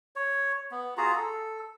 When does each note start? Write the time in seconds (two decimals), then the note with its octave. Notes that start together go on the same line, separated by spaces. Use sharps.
0.16 C#5
0.71 B3
0.97 F4 F#4 G#4 A#5
1.15 A4